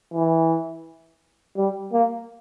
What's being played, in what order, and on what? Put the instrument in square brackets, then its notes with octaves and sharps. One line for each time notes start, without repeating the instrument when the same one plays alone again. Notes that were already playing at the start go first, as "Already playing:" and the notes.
[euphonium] E3
G3
A#3